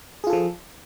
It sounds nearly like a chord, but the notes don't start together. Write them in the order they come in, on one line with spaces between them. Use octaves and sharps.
G#4 F4 A4 F3